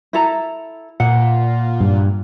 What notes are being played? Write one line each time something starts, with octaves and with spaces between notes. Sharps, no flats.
E4 A4 A#5
A#2 F#5
G2